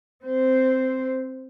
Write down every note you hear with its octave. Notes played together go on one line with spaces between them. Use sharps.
C4 C5